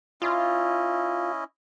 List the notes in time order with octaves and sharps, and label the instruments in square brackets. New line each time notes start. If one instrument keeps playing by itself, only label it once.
[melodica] C#4 E4 D#5 [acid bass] F4